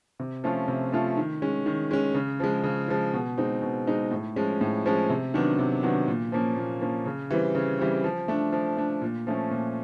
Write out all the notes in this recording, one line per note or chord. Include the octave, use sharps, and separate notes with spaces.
C3
F3 A3 C#4 F4
C3
F3 A3 C#4 F4
D#3
G#3 C#4
D#3
G#3 C#4
C#3
F3 G#3
C#3
F3 G#3
B2
G#3 C4 D#4
B2
G#3 C4 D#4
A2
F3 G#3 C#4
A2
F3 G#3 C#4
C3
D#3 F#3 B3 D4
C3
D#3 F#3 B3 D4
A#2
F3 A#3 C#4
A#2
F3 A#3 C#4
C#3
E3 G3 C4
C#3
E3 G3 C4
F3
A3 D4
F3
A3 D4
A#2
F3 A3 C#4
A#2